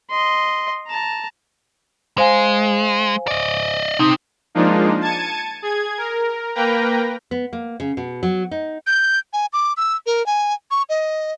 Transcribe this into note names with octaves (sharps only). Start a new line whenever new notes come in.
D#5 C6
A5 A#5
G#3 C5 F5 G#5
D5 D#5
C3 C4 D#4 D#6
F3 G#3 A#3 D4 D#4 F4
A5 G#6 A6 C#7 D#7
G#4 G#6
A#4
A#3 A#4 B4 G5 A#5
B3
A#3
C#3
B2
F#3
D#4
G6
G#5
D6
E6
A#4
G#5
C#6
D#5